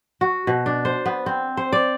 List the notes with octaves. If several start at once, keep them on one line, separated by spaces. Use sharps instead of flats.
F#4
B2
D4
C5
B3
C4
C5
D5